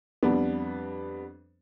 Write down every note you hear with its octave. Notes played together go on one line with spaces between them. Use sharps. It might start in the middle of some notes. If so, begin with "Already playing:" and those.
F2 G3 B3 D4